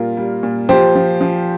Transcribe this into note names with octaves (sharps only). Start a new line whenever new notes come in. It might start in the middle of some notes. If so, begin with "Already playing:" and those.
Already playing: A#2 G3 F4 A#4
G3
A#2
F3 G4 C5
F3
F3